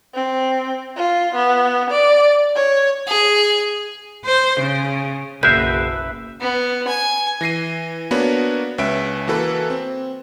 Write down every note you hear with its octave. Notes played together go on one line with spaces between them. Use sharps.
C4
F4
B3
D5
C#5
G#4
C5
C#3
F#1 B1 F#4 G#4 A#4 B4 E5 G6
B3
G#5
E3 A#6 C7 D#7
A#3 B3 D4 F#4 B4 C#5
C#2 C#4 B4 E5 D7
E3 A#3 F#4 A4 B4
C4